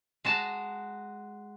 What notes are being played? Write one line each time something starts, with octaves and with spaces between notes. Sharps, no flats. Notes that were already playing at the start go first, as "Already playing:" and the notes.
G#3 F#4 A5 A#5